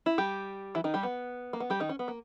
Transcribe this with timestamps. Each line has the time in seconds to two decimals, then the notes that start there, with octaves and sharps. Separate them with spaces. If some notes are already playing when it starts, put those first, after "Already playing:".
0.06 E4
0.18 G3 G4
0.75 E3 E4
0.84 D#3 D#4
0.94 G3 G4
1.03 B3
1.53 A#3
1.60 B3
1.70 G3 G4
1.80 D#3 D#4
1.89 C#4
1.99 B3
2.08 A#3